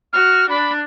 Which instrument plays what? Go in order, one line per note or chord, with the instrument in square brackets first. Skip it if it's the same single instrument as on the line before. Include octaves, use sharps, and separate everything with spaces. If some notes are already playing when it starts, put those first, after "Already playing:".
[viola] F#4 [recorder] F6
[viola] D4 [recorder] B5